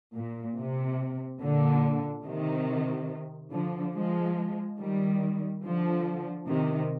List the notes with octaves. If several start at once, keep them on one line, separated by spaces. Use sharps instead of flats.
A#2
C3
A#2 D3
C3 D#3
D3 F3
F3 G#3
D#3 G3
D3 F3
C3 D#3